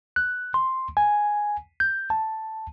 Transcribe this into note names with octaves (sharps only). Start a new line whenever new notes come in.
F#6
C6
G#5
G6
A5